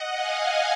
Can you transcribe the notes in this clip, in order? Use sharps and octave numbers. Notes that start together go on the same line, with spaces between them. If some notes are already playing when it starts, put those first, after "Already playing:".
Already playing: D#5 F#5
F5 G#5